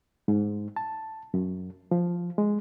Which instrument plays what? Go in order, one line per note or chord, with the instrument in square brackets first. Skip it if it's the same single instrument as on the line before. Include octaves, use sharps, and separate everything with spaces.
[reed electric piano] G#2
A5
F#2
F3
G#3